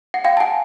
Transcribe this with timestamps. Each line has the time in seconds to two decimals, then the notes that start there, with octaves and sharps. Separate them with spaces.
0.14 F#5
0.24 F5 G5
0.37 A5
0.40 F#5 G#5